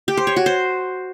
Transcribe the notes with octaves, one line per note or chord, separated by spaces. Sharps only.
G4
C5
C#5
F#4
C5